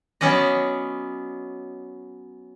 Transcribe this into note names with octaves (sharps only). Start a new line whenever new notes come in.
F#3 B3 C#4 D5 D#5